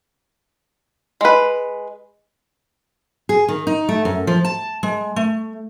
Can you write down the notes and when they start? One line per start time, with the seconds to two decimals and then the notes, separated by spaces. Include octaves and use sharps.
1.21 G#3 B4
3.29 G#4
3.48 D#3
3.67 D#4
3.89 A3
4.05 F#2
4.27 F3
4.45 A5
4.83 G#3
5.16 A3